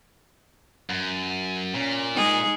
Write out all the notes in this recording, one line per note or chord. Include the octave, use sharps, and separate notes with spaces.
F#2
A#2 C#4
G#3 D#4 G#4